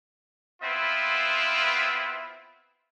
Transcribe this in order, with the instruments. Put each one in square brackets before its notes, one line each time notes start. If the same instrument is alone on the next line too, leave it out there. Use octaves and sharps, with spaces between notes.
[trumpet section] B3 C4 E4 F4 B4 E5